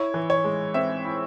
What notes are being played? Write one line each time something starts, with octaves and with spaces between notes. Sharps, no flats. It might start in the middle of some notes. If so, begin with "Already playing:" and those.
Already playing: E4 C#5
E3
C#5
G#3
C4 E5
E4